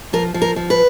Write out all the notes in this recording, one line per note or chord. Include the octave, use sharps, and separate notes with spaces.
F3 A#4
F3
A#4
F3
B4